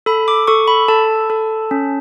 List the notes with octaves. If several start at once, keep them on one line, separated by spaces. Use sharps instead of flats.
A4 B5
D6
A4 C#6
B5
A4 A5
A4
C#4